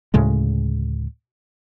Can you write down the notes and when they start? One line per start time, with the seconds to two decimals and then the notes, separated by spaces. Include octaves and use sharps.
0.14 D2 A2 C#3 G#3